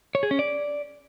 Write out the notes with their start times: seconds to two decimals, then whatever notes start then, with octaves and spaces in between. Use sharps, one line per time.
0.15 C#5
0.23 G#4
0.31 C#4
0.39 D5